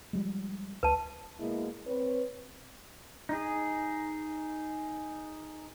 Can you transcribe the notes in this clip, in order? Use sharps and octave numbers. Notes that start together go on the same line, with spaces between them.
F3 G3 G#3
C#2 B4 A5
B2 G#3 A#3 E4 G#4 D#5
C4 B4 C#5
D#4 G#4